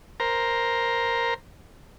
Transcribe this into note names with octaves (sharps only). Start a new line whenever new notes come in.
A#4 C5 A#5